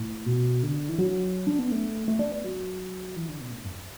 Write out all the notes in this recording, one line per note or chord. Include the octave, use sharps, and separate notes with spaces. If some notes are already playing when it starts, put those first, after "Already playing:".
Already playing: A2
B2
D3
E3
F#3
D4
B3
A3
A3
D4
B3
F#3
E3
D3
B2
A2
F#2